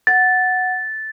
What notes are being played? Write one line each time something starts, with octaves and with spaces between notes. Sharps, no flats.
F#5 A6